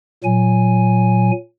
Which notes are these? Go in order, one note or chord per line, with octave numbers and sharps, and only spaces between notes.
A#2 F#3 G#5